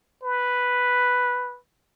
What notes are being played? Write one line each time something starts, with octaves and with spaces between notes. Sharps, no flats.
B4